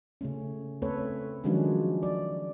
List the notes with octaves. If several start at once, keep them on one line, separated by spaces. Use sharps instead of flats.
C#3 A3 C#4
A3 C4 A4 B4 C#5
D#3 F3 F#3 G#3 C#4 D4
D5